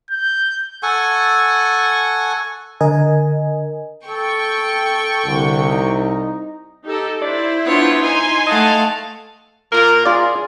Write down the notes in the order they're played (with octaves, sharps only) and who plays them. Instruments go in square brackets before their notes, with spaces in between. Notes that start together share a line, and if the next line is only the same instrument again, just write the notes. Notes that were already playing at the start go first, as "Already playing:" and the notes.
[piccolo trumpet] G6
[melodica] A4 F#5 G#5 C#6
[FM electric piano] D3 A#4 D#5 G#5
[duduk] A4 [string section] G5 C#6
[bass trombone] C2 [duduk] D3
[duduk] D#4
[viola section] D#4 G4 A4
[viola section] E4 C5 [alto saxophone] D5
[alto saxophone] B3 [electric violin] D4 F4 [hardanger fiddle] C#5
[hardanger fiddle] D#4 [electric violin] G#5 C6
[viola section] A3 F#5 [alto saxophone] D#5 [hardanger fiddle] F5 A5
[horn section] A#2 F4 A#4
[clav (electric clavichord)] F4 D5 [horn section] G#4